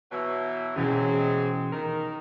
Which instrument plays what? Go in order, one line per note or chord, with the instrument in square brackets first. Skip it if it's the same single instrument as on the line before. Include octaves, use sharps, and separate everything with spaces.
[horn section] B2 E3 F#3
[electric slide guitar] B2 E3 C#4 [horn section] F#3 G#3 C4
[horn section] D#3 [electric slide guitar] A#4